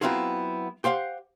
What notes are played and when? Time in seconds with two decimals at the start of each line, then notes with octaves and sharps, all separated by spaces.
0.01 F#3 B3 C4 E4 F4 G#4
0.84 G4 C5 F5 F#5